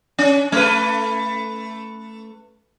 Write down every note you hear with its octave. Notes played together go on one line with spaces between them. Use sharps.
C#4
A3 B4